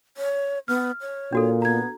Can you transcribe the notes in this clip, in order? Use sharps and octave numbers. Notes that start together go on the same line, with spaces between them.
C#5
B3 F6
C#5
A#2 D4 F#4 A4
B3 A#5 G#6